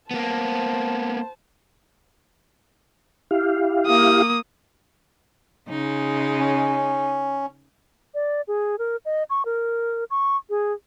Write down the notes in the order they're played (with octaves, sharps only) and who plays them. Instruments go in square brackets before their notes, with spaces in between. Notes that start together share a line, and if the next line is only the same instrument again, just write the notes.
[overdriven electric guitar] A#3 B3 [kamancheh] C5 A5
[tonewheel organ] E4 G4 F5
[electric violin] A#3 D#6
[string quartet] C#3 G#3 D#4
[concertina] C#4
[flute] D5
G#4
A#4
D#5
C#6
A#4
C#6
G#4